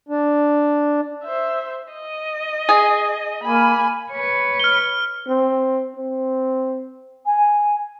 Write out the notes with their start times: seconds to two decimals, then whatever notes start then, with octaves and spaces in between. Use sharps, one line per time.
0.09 D4
1.24 C5 E5
1.93 D#5
2.69 G#4
3.44 A#3 G#5 B5
4.12 B4 C#5
4.60 F6 G7
5.28 C4
5.97 C4
7.26 G#5